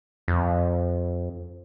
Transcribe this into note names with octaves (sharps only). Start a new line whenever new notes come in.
F2